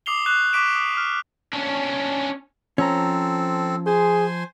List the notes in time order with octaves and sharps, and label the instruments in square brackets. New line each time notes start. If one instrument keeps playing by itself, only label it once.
[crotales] D6 D#6 C7 F7 G7
C#6 F#6 C7 F7
C#6 D6 B6 D7 E7
D#6
F6
[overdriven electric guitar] C#4 D4
[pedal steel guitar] F3 A#5 [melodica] C4 A4 [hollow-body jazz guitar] C#4
[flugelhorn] G#4 [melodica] C5 G#5 C6